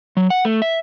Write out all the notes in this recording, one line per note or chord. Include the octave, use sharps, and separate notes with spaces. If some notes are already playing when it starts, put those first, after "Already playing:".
F#3
F#5
A3
E5